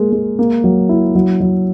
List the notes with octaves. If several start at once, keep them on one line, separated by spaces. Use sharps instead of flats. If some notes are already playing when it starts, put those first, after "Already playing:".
Already playing: G#3 A#3 A#4
G#3
A#3
F#3
E4
F#3
F#3